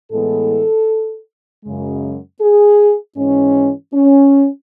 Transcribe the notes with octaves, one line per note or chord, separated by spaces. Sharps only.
A2 E3 G#3 B3 A4
F#2 C#3 G#3
G#4
G#2 E3 G#3 C#4
C#4